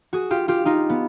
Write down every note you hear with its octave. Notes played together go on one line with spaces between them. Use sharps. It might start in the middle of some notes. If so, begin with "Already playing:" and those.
F#4 G#4
F4 G4
F4 G4
D#4 F4
B3